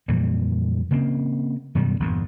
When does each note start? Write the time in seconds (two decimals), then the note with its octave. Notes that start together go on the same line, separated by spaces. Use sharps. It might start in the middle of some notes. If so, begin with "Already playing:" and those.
0.08 F2 A#2 E3 G3
0.91 C#3 A#3 C4
1.75 F#2 B2 D#3 G3
2.00 G1 E2 G2 A#2